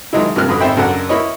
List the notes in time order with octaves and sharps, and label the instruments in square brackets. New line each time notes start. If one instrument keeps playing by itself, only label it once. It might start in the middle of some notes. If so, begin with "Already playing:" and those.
[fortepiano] D#3 F3 F#3 G#3 D#4 E4
G2 C3 F3 A#3 F6 F#6
F#2 A#2 D3 B4 D#6
G#1 D#4 C5 E5 G5 B5
C#2 F#2 D4 A4 A#4 F#5
A#3 E4 B4 C#5 D#5